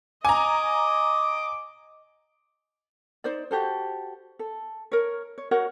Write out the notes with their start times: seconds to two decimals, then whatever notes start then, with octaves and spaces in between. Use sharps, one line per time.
0.25 D#5 G#5 A#5 D6
3.24 D#4 C5 D5
3.51 F#4 G4 A4 C5
4.39 A4
4.92 A#4 C#5
5.38 C#5
5.51 F#4 A#4 C#5 F#5